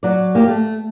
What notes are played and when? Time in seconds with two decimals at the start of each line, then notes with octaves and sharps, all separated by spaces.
0.03 F#3 D5
0.35 A#3 G4
0.47 A3